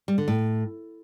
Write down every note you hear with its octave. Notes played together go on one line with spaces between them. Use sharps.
G3
D3
A2